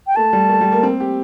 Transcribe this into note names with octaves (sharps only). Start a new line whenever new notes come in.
G5
A3 A5
G3
A3
G3
A#3
C4
G4